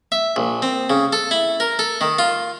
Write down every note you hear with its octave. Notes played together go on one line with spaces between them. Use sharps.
E5
A#1
C4
C#3
A4
E4
A#4
A4
D#3
F4